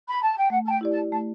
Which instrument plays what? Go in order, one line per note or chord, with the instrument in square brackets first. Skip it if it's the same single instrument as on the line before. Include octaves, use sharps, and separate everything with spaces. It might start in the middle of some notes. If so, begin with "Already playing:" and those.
[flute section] B5
A5
G5
[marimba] A3 [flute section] F#5
[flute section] A5
G5
[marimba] E4 G4 D5
[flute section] A5
[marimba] A3 [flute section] A5